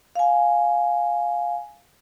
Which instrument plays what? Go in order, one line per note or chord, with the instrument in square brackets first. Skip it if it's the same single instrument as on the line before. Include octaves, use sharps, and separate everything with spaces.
[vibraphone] F5 G#5